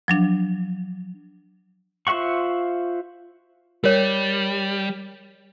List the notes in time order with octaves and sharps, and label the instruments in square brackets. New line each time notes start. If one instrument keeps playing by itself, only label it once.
[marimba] F3 F#3 D4
[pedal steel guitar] F4 C5 E5 F#5 C#6
[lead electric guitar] G3 [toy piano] A#4 C#5